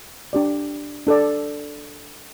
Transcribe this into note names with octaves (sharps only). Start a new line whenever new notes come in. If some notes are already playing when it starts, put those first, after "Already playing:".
D4 G4 D5
D4 A4 D5